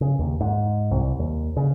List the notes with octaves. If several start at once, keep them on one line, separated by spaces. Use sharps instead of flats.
C#3
D#2
G#2
C2
D#2
C#3